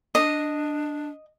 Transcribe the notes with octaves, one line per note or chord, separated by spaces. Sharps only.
D4 D#5